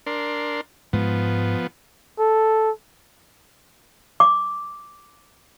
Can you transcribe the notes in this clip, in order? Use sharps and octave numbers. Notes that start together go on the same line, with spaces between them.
D4 A#4 C6
G#2 F3 G#3 B3
A4
D6